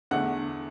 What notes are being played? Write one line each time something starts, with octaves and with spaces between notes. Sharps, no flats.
E2 D3 A3 F#5